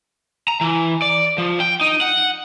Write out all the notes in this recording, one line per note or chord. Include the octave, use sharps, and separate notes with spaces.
A#5
E3
D5
F3
G5
D#4
F#5